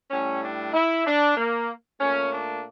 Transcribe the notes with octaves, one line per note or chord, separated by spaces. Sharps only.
A2 G3 C#4
D4
E4
D4
A#3
A#2 A3 C#4
D4